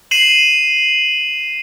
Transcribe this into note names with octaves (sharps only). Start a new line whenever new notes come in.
C7 D#7 E7 F#7